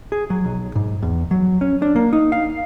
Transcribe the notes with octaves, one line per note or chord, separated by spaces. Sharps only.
G#4
F#3
B1
G#2
E2
F#3
C#4
D4
A#3
D#4
F5